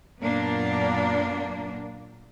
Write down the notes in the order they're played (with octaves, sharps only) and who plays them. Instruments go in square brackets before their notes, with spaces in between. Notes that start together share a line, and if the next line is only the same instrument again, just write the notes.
[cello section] F#2 A#2 A#3 B3 D4